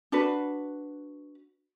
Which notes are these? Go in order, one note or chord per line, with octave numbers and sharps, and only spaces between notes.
D4 F#4 B4